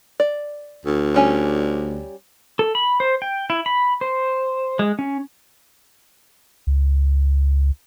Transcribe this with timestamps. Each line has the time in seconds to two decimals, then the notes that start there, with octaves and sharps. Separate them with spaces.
0.20 D5
0.86 D2
1.15 G3 C#4 G#5
2.59 A4
2.75 B5
3.00 C5
3.22 G5
3.50 E4
3.66 B5
4.01 C5
4.79 G#3
4.99 C#4
6.67 C#2